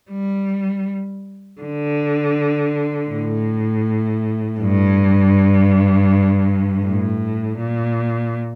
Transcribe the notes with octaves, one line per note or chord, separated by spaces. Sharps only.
G3
D3
A2
G2
A2
A#2